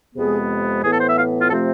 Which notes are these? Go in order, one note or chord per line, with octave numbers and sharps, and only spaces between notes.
F2 C3 G#3 B3 G#4
A2 E3 B3 G#4
A4
C5
E5
F5
F4
C3 F3 A3 C4 A4